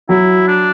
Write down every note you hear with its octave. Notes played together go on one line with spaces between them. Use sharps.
F#3 E4
D4